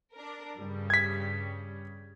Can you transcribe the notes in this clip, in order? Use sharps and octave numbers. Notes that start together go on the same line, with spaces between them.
D4 A#4
G2 C#3 G3
G#6 B6